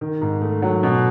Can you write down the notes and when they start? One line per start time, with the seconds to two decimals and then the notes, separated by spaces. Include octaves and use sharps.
0.01 D#3
0.22 G#2
0.41 A3
0.62 F#3
0.83 B2